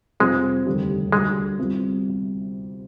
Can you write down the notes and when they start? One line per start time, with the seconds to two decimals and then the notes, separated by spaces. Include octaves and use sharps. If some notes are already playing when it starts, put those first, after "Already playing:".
0.20 F2 C3 G3 G#3 C4 F4
0.66 F1 D#2 D3 G3
1.12 D2 D3 G3 G#3 D4
1.59 C2 C3 G3 B3 F4